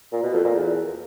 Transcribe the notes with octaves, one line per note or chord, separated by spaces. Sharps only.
A#2
B2
F2
A#2
E2